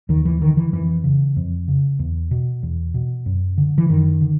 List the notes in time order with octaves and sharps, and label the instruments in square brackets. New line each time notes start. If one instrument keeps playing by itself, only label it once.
[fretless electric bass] D#2 D#3
E3
D3 D#3
E3
F2 E3
C#3
F2
C#3
E2
B2
E2
B2
F#2
D3
E3
F#2 D#3
D3